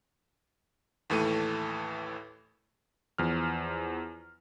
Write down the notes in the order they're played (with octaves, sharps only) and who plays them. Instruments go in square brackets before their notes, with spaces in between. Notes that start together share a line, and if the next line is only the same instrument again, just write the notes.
[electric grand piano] D#2 A2 E3 A3 A4 D#7
E2 F3 F6